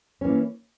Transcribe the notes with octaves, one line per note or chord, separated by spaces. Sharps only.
E3 A#3 C#4